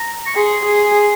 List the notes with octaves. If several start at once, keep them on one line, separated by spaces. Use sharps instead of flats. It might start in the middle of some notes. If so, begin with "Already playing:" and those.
Already playing: A#5
C#6
G#4 C6
G#4